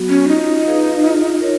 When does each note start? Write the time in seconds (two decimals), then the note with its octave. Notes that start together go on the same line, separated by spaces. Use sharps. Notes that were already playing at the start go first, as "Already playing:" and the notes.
Already playing: F#3 B3 F#4
0.09 C#4
0.28 D#4 F4
0.66 G#4 B4 F5
1.03 F4
1.41 A#4 C#5